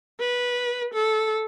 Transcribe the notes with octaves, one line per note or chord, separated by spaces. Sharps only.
B4
A4